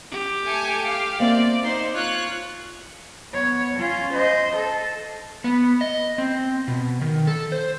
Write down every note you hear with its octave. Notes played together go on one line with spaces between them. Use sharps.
G4
A3 G#5 C#7
F5
A#3 C4 D5 E5
D#4 C5 C6
F4 C#5 F#6
B3 C#5
C#4 F4
C5 D#5
A4
B3
D#5
C4
B2
D#3
A4
C5